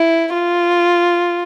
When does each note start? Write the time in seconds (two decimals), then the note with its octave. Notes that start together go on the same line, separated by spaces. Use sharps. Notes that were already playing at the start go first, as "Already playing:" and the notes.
Already playing: E4
0.34 F4